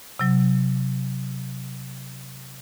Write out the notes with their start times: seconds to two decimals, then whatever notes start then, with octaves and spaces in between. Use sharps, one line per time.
0.19 C3 F#3